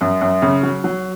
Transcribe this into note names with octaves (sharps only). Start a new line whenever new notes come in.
F#2
F#2
C#3
F#3
F#3